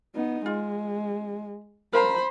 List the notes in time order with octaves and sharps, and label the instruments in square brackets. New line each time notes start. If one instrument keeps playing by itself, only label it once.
[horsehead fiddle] B3 D#4
[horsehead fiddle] G#3 [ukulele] F4
[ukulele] A#4 F5 A#5 [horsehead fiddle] C5 B5